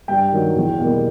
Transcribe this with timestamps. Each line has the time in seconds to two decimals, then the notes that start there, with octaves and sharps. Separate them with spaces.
0.08 G2 G5
0.32 D#3 F#3
0.56 E2
0.79 B2 G3 A#3